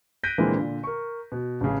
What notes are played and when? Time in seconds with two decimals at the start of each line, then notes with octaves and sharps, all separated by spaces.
0.23 F#6 G6 A#6 B6 D7 D#7
0.38 A#2 D3 E3 G#3 A#3 C4
0.56 A#2 D3
0.83 A#4 C#6
1.32 B2
1.61 A1 C#3